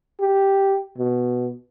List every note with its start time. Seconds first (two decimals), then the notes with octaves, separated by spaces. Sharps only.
0.21 G4
0.98 B2